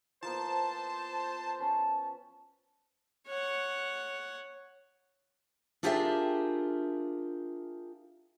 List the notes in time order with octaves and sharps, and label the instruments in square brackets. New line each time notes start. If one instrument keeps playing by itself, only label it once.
[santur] F3 A#3 B3 [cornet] C5 [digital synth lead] A5
[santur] C#4 B4 [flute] A5
[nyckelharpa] C#5 F#5
[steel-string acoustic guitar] D4 F4 G4 G#4 A#4 E5